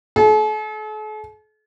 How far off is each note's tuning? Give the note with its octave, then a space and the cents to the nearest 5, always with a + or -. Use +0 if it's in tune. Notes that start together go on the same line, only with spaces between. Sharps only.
A4 -45